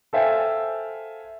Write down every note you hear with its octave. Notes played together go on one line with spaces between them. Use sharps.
A4 C5 E5 F5 G5 G#5